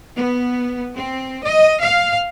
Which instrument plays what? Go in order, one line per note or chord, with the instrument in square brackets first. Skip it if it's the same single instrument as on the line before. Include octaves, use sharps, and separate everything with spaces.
[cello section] B3
C4
D#5
F5